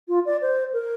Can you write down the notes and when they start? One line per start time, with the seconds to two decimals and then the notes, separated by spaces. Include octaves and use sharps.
0.08 F4
0.25 D5
0.41 C5
0.73 A#4